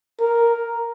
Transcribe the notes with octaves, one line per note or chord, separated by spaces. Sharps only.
A#4